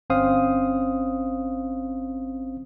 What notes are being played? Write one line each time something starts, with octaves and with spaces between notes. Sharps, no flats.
G1 C4 C#4 C5 F5 D#6